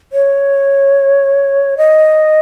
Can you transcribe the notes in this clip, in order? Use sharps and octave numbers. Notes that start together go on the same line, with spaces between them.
C#5
D#5